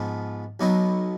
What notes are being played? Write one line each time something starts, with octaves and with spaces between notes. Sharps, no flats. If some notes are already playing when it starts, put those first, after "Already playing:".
Already playing: G#2 F3 B3 F4
B1 B2 F#3 B3 D#4